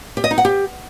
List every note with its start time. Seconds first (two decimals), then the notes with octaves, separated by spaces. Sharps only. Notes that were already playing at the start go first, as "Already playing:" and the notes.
0.17 G4
0.24 D#5
0.31 D#4
0.38 F#5
0.45 G4